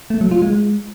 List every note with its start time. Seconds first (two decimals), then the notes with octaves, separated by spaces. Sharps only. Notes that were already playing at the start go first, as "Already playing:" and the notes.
0.10 A3
0.21 F#3
0.31 F4
0.42 G#3